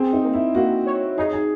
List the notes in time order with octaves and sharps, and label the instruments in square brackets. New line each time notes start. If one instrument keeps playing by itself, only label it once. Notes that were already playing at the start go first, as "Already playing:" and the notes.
Already playing: [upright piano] C4 [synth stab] G#4
[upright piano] D#4
[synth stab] A#3
[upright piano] E4
[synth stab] A#3 [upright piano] F#4
[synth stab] C#5
[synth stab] D#4 [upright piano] G#4
[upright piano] G#4